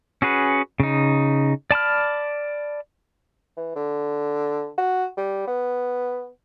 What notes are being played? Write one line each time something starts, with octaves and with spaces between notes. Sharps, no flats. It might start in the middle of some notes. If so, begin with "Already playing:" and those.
C#4 F#4 G#4 B4
C#3 D#4
D5 A5 B5 F6
E3
D3
F#4
G3
B3